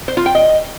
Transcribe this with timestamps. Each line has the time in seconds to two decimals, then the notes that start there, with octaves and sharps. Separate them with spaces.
0.08 C5
0.17 F4
0.26 G5
0.35 D#5